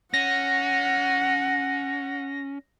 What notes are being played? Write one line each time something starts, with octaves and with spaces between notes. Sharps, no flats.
C#4 F#5 A#6